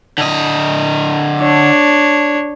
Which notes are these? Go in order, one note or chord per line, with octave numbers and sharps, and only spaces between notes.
D3 D#5
D4 C#5